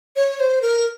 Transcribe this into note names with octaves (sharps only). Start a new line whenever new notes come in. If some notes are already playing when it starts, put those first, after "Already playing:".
C#5
C5
A#4